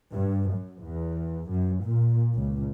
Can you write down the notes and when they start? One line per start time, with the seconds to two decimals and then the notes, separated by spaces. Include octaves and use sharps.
0.12 G2
0.51 F#2
0.83 E2
1.49 F#2
1.83 A#2
2.37 C#2